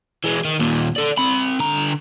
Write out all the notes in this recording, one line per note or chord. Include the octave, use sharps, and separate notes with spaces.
E3 G#3
D#3
D#2 A#2
A4 D5
C4 B5
D3 A#5